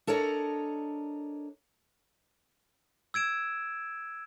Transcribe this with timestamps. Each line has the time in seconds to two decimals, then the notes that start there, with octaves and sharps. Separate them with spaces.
0.07 D4 A4 A#4 C#5 D#5
3.14 E6 G#6 D7 E7